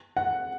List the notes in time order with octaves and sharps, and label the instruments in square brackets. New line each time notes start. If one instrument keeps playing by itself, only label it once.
[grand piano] F#5